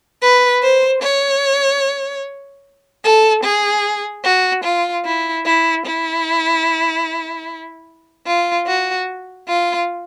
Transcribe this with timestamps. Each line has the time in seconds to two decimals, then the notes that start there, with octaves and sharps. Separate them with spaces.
0.22 B4
0.63 C5
1.03 C#5
3.04 A4
3.44 G#4
4.25 F#4
4.64 F4
5.05 E4
5.46 E4
5.86 E4
8.27 F4
8.67 F#4
9.48 F4